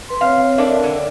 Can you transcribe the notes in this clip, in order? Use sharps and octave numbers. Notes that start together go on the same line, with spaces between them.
B4 C6
C4 C#5 F5
A3 D4 A#4 D5 E5
D3 G5